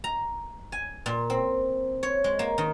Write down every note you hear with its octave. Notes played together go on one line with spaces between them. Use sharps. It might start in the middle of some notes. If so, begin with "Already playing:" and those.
A#5
G#5
A#2
C4
C#5
G#3
A#3
D#3